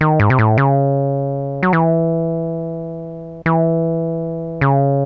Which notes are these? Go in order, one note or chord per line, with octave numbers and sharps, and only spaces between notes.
D#3
G#2
C3
A2
C#3
F#3
E3
E3
C#3